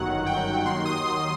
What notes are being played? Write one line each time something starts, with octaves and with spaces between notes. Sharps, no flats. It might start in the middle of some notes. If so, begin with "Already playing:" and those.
Already playing: G1 F#2 D#3 F#3 F#5
G5
D#2 D#3 F#3 C6
D#6
C6